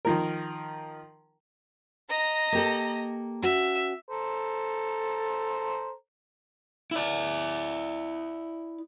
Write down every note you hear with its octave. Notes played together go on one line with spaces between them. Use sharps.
D#3 F3 A#4
D#5 A#5
A#3 G4 A4
C#4 F#4 E5
A4 C5 A#5
E4 D5